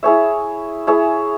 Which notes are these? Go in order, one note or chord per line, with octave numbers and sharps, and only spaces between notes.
E4 G#4 C#5 E5
E4 G#4 C#5 E5